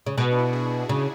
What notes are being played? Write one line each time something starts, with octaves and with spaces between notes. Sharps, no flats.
C#3
B2 G#4
D4
E4
F#4
G#4
C#3